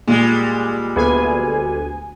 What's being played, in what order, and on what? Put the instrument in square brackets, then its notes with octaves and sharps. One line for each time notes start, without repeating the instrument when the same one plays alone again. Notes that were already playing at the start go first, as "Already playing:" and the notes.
[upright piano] A#2 [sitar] G3 G#3
[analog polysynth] D2 G#5 [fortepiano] B3 G#4